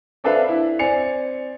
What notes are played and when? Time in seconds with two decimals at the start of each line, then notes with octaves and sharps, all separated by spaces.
0.24 C4 D4 A4 B4 E5 F5
0.49 E4
0.79 C4 D5 G#5 C#7 F7